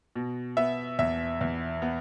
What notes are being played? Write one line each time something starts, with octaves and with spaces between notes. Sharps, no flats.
B2
B3 E5
E2 E5
E2
B3